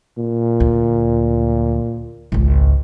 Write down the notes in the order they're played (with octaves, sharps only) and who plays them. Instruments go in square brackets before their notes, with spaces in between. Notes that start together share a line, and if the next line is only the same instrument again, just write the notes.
[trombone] A#2
[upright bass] D2
G#1 C#2